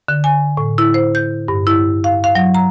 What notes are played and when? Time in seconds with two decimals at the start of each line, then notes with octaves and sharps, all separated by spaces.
0.08 D3
0.24 G#5
0.57 A2
0.78 E4
0.94 C5
1.15 G6
1.48 G2
1.67 E4
2.04 F5
2.24 F5
2.35 F#3
2.55 A#5